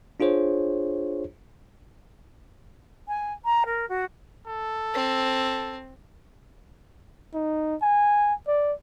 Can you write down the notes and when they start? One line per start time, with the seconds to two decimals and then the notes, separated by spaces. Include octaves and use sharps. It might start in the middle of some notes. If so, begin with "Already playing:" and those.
0.20 D4 F4 G#4 C5 C#5
3.08 G#5
3.44 A#5
3.65 A#4
3.89 F#4
4.47 A4
4.94 C4
7.34 D#4
7.82 G#5
8.47 D5